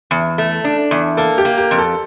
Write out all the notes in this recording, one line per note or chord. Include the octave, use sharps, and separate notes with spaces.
E2
A3
D4
E2
A#3 A4
G4
A#3
G4
F2
A4